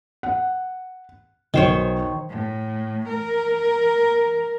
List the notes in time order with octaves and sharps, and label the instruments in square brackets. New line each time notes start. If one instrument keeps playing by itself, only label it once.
[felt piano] F#5
[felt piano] B1 [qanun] D#3 C5 C#5
[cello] A2
A#4